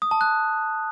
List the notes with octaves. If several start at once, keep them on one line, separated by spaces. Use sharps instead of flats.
D#6
A5
F#6